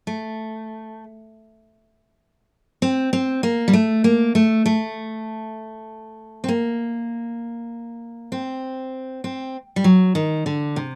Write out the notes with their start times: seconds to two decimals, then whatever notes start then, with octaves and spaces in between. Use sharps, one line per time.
0.07 A3
2.82 C4
3.13 C4
3.43 A#3
3.68 G3
3.73 A3
4.04 A#3
4.35 A3
4.66 A3
6.44 C4
6.48 A#3
8.32 C4
9.24 C4
9.76 G3
9.84 F#3
10.15 D#3
10.46 D3
10.76 C3